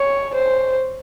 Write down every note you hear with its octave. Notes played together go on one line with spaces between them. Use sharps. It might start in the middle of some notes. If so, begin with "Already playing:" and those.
Already playing: C#5
C5